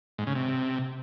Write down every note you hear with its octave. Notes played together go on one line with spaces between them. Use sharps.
G#2
C#3
C3